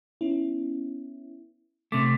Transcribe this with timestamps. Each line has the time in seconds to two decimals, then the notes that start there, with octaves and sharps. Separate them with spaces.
0.21 B3 C#4 E4
1.92 C3 A3 D6